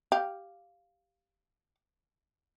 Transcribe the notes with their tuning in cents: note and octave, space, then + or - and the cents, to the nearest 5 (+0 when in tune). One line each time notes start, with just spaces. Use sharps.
G4 +0 F5 +0